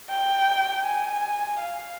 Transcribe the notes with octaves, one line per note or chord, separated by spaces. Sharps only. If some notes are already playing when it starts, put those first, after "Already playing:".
G5
G#5
F5